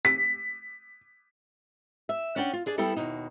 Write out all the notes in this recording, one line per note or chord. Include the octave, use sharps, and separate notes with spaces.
B6
E5
C#4 D4 D5 F#5 G5
F4
D4 G#4 D5
G3 B3 E4 G4 A4
D#2 B2 D#4